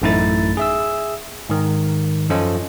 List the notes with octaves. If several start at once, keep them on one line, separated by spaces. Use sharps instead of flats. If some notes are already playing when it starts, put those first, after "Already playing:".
A1 F#2 A3 D#4 E4 A6
G#4 E5 E6
G#2 D#3
F#2 F3 C#4 F4 A4 D#5